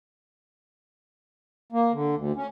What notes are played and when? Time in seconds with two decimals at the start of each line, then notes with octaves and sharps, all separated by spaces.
1.72 A#3
1.93 D3
2.15 D2
2.36 C#4